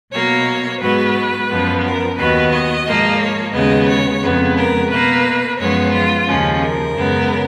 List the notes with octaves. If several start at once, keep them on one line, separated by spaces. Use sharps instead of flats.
B2 F#3 A#3 C#5
G#2 F#3 B3 B4
F#2 F3 B3
A#4
D#2 D#3 F#3 B3 B4
D#5
G#2 F3 A#3
C#5
D#2 C#3 G#3 B3 D#5
C#5
F2 C#3 G#3 B3
A#4
B2 A#3 B4
F#2 F3 G#3 B3 C#5
F4
D#2 C#3 F3 C#4
A#4
F#2 C#3 G#3 B3